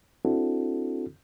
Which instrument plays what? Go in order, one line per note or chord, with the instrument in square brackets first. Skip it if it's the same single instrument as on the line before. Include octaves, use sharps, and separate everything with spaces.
[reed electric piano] C4 D4 E4 F#4 A4